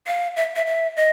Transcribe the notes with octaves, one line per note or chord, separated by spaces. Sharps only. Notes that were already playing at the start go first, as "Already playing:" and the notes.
F5
E5
E5
E5
D#5